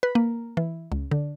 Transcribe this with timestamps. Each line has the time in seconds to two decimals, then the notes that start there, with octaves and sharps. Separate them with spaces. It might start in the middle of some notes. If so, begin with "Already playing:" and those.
0.03 B4
0.15 A#3
0.57 E3
0.92 C#2
1.11 D3